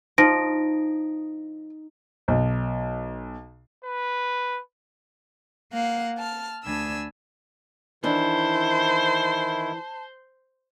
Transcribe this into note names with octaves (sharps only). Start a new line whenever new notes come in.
F3 D#4 A#6 D7
B1
B4
A#3 F5 F#5
A5 F6
D2 D4 G#5 B5 E6
D#3 E3 D4 E4 C5 A5